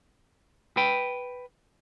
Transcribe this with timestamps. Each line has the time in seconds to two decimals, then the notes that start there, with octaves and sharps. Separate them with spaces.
0.77 B4 G5